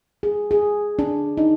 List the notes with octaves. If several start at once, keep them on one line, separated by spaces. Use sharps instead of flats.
G#4
G#4
D4
D#4